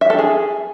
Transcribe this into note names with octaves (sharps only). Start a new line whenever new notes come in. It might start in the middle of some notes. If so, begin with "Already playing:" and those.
E5
A4
G#4